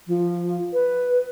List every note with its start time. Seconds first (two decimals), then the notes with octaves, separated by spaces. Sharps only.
0.07 F3
0.73 B4